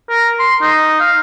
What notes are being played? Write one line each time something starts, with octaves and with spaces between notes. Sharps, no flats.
A#4
C6
D#4
F5